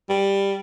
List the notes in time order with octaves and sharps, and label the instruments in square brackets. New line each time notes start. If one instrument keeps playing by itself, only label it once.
[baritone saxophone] G3